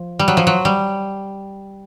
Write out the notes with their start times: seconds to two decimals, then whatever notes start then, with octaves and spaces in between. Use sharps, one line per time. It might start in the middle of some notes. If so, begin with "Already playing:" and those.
Already playing: F3
0.19 G3
0.28 F#3
0.37 F3
0.47 F#3
0.65 G3